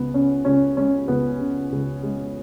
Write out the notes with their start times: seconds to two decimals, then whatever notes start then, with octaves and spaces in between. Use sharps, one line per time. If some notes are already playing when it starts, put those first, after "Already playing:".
Already playing: C#2 B3
0.14 C#3 C#4
0.45 C#2 C#4
0.77 G#3 C#4
1.08 C#2 B3
1.41 C#3
1.72 C#2
2.03 G#3